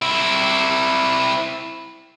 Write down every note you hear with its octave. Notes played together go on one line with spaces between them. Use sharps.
C4 E4